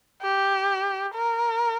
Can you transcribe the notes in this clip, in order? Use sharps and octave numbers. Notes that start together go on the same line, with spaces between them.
G4
A#4